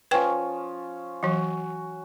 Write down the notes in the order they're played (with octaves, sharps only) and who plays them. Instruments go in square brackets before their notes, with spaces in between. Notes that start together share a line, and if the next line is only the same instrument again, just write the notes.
[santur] F3 C#4 C#6 [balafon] B4 G5
[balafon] E3 F#3 [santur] F#4